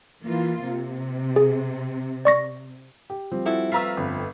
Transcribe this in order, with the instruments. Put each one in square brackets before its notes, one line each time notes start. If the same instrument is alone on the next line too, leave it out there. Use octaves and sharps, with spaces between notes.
[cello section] E3 A#3 F4
C3
[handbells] G#4
D5 C#6 A#6
[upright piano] G4
F3 G3 C4
[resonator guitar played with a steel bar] E4 F#4 A4
[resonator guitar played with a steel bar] A3 B4 [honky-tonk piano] F5 A#5 E6
[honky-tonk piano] G1 F2